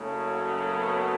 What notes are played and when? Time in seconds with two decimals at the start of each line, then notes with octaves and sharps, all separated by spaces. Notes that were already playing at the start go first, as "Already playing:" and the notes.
Already playing: F#1 F#2 C#3 F#3 A3
0.28 F#4
0.72 B3